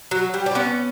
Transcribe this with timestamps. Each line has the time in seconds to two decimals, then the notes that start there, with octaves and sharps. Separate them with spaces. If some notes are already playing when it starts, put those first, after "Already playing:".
0.11 F#3
0.34 G3
0.46 D4
0.55 B3 C#4